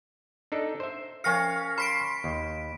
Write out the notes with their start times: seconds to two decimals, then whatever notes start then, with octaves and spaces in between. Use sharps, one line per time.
0.52 D4 D#4 A4
0.80 C5 E5
1.24 F3 C#4 F5 A#6 C#7
1.78 B5 C6 B6 D7
2.24 D#2